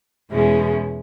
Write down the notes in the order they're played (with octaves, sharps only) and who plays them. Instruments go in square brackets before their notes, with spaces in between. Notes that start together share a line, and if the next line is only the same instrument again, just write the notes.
[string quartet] E2 B2 G#3 C#4 E4